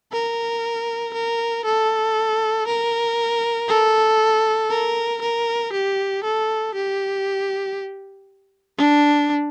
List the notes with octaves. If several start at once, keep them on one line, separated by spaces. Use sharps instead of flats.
A#4
A#4
A4
A#4
A4
A#4
A#4
G4
A4
G4
D4